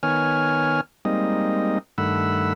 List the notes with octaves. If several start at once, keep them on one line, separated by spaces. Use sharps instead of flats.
D#3 B3 C#5 G#5 F6
G3 G#3 A#3 C4 D#4 D#5
G2 D#3 A3 F#5 B5 E6